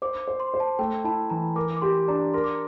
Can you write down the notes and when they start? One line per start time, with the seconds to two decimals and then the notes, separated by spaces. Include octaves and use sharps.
0.02 C5 D6
0.28 C5
0.40 C6
0.54 C5
0.60 A5
0.79 A3 G5
1.04 E4 A5
1.30 E3 A#5
1.56 A#4 D6
1.77 D6
1.81 G4 C6
2.08 D4 A#5
2.34 A#4 C6
2.44 D6